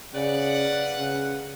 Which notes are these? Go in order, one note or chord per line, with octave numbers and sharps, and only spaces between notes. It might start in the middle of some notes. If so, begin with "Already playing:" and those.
C#3 B4 D5 F5 F#5
C#3